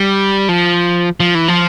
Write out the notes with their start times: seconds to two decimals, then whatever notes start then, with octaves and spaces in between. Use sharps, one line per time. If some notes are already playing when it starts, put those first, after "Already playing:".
Already playing: G3
0.49 F3
1.20 F3
1.35 E3
1.48 F3